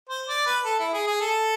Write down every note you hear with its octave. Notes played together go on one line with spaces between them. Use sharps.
C5
D5
B4
A4
E4
G#4
G#4
A4